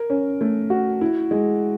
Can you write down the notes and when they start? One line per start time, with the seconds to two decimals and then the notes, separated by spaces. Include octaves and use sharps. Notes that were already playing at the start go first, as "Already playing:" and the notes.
Already playing: A#4
0.10 C#4
0.41 A3
0.70 F#4
1.01 E4
1.31 G#3